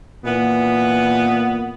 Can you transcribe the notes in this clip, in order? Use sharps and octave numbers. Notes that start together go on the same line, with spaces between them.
A#2 E3 B3